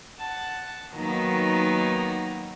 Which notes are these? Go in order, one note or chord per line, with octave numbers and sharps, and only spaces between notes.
F#5 A5
D#3 F#3 A#3 B3 D#4